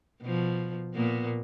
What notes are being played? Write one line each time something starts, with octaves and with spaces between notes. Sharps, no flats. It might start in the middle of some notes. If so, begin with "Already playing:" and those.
B2 F3
A#2 A#3 B3